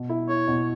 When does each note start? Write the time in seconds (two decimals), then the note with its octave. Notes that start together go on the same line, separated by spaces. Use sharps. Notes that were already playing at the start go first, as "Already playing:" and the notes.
Already playing: B2
0.09 E4
0.29 E4 C#5
0.48 B2